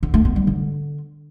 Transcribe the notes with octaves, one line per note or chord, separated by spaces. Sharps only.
D3
A3
B3
G3
D3